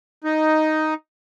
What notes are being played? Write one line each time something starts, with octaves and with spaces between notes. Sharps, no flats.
D#4